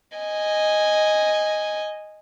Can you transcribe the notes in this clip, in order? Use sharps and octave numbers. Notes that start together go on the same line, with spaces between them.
D#5 G#5